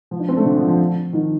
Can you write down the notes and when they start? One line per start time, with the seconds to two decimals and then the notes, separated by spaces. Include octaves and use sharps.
0.11 F3
0.20 D4
0.29 C4
0.37 A3
0.45 D3
0.56 F3
0.68 F3
1.13 D#3